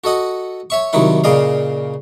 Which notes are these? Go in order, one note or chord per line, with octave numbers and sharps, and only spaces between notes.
F#4 A4 D#5 F#5
C#5 E5 C#6
C2 D#3 F#3 E4 F#5
A#2 C#3 D5 D#5 F5